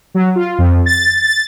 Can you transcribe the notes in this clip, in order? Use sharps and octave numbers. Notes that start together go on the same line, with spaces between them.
F#3
F4
F2
A6
A6